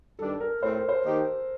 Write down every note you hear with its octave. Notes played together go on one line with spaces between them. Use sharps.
G2 D#3 G3 D4 A4
A#4
A2 A3 C4 C5
A#4
C5
D#3 A#3 D#4 G4